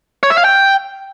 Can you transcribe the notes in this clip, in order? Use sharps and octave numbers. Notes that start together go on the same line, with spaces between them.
C#5
E5
F5
G5